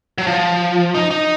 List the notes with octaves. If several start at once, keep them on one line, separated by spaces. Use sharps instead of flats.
F#3
F3
D#4
D#4